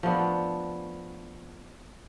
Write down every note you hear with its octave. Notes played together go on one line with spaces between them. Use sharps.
F3 A3 B3 D4